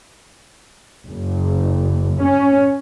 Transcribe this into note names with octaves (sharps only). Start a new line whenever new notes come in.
F#1
C#4